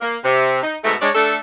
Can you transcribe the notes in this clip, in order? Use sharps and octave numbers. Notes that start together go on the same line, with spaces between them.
A#3
C3
D#4
G#2 B2 A3
G#3 D4 C#5 D5
A3 D4 A4